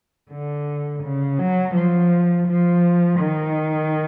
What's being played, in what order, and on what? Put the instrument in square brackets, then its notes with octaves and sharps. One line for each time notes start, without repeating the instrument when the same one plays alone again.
[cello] D3
C#3
F#3
F3
F3
D#3